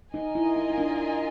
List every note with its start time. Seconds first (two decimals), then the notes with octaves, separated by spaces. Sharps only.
0.14 D#4 F4 A#4 D#5 G#5
0.35 E4
0.56 D#4
0.70 D#4
0.78 D4